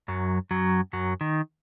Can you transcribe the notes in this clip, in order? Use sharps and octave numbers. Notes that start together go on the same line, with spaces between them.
F#2 F#3
F#2 F#3
F#2 F#3
D#3